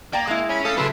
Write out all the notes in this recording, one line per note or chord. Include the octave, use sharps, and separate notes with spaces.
A#3 D5 G5 A#5
G#3 E4
C#4 B5
A3 A4 F5 D#6
C#3 F#3 E4 A4 B4 C6